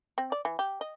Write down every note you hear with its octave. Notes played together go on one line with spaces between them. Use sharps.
C4
D5
E3
G4
D#5